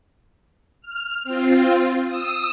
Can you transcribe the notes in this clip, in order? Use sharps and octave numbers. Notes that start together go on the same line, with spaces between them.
F6
C4 F4
D#6 E6